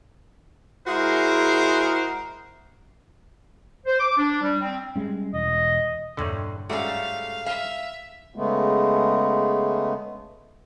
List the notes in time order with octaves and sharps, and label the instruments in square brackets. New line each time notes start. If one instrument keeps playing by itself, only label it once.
[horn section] G#3 E4 F#4 G#4 A#4 C5
[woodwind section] C5
D6
D4
G3
C4
[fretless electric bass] G3 G#3 C#4
[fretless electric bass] E1 [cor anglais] D#5
[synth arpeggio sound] E2 G2 A#2 [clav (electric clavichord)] D3 C#5
[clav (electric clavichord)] G#2 G3 F#4 [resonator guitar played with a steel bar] A3 C#4 [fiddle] F5
[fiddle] E5 [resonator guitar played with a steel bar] F5
[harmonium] C#3 G#3 A3 B3